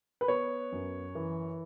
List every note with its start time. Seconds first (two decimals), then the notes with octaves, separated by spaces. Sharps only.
0.21 B4
0.28 B3 C#5
0.72 F#2
1.15 E3